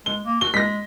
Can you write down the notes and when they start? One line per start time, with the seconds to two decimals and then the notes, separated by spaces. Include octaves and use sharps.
0.06 G#3 G7
0.26 A#3
0.41 F#4 G7
0.54 G#3 A#6 B6